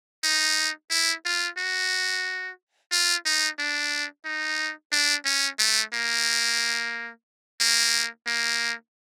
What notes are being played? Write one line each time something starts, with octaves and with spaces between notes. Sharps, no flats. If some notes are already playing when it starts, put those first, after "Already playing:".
D#4
E4
F4
F#4
F4
D#4
D4
D#4
D4
C#4
A3
A#3
A#3
A#3